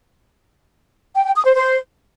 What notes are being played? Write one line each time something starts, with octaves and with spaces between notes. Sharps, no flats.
G5
G5
D#6
C5
C5